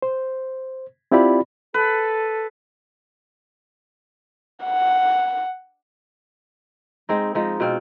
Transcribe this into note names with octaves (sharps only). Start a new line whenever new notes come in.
C5
C4 E4 F4 G4 D5 B5
A4 B4
F#5
G#3 C4 D#4
F3 G#3 D#4
B2 C4 F4